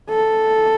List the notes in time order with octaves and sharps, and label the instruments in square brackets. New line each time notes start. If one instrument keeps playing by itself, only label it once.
[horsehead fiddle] A4